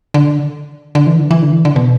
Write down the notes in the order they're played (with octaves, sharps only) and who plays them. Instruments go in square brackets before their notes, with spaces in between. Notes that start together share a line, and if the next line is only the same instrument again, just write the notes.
[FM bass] D3
D3
E3
D3
E3
D3
E3
D3
B2